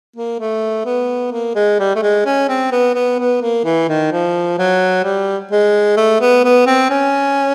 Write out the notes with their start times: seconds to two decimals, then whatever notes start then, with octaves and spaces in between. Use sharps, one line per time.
0.16 A#3
0.40 A3
0.86 B3
1.32 A#3
1.55 G#3
1.79 G3
1.96 A3
2.03 G#3
2.26 C#4
2.49 C4
2.72 B3
2.95 B3
3.19 B3
3.42 A#3
3.65 E3
3.88 D#3
4.12 F3
4.59 F#3
5.04 G3
5.51 G#3
5.97 A3
6.21 B3
6.44 B3
6.67 C4
6.90 C#4